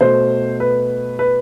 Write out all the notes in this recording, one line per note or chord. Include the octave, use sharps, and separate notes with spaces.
B2 A3 C5
B4
B4